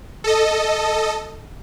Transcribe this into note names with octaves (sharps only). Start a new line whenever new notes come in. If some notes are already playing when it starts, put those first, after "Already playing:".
A4 D#5